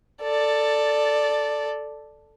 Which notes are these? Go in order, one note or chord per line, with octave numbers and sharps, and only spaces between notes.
A4 D5